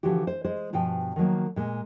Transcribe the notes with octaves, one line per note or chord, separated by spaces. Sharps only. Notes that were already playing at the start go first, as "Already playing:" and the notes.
D3 E3 F3 F#4 G4
C5
G#3 G#4 C5
G2 B2 F3 G5 G#5
D#3 F3 F#3 A#3
A#2 G#3